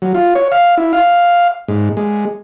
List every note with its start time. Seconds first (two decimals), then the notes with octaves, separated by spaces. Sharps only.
0.02 F#3
0.15 F4
0.35 C#5
0.51 F5
0.78 E4
0.93 F5
1.68 G#2
1.97 G#3